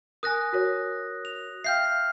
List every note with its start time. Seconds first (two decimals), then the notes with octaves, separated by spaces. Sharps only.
0.23 A#4 G#5 D#6 F#6 A#6
0.53 F#4 A#4 C#5
1.25 F7
1.64 E5 F5 G5 F6 G6 C7